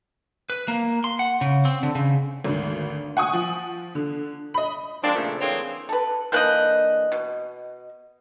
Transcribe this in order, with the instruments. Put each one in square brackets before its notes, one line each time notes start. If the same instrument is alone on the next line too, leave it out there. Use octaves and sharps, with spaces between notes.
[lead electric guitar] B4
A#3
C6
F#5
C#3
C4
D3
C#3
[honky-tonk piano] G#1 D2
F#5 G#5 C#6 D#6
F3
D3
D#5 B5
[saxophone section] F3 G#3 A#3 C4 D4
A#2 C#3 F3 A3
D3 E3 A#3 C4 G#4 C#5
[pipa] A4 B4
[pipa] D3 E3 A#3 [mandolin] D#5 F#6 G6
[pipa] B2